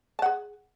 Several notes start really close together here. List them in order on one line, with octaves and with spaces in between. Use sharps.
A5 F#5 G#4